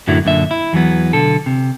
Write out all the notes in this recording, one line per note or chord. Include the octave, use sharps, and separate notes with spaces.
F#2 A2 D3 F#3 E4
F#2 A#2 D3 E5
E4
E2 E3 F#3 B3
B1 D3 A4
C3